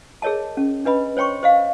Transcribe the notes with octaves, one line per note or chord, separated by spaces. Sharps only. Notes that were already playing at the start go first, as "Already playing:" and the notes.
G#4 A#4 C#5 D#5 A5
C#4
D4 B4 D#5 B5
C5 C#5 G5 C6 C#6
C5 D#5 F5